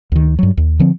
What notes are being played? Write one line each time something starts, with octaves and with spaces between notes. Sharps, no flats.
D2 D#3
G2 F#3
D#2
D3 F3 C4